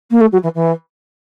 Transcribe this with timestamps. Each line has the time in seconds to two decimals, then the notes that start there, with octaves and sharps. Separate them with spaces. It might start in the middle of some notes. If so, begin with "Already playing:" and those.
0.10 A#3
0.20 A3
0.32 F#3
0.43 E3
0.54 E3